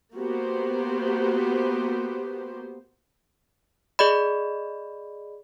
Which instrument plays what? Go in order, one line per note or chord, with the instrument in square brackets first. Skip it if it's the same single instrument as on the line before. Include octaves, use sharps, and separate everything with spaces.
[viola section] A#3 B3 F#4 G4 C5
[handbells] G#4 D5 D#5 B5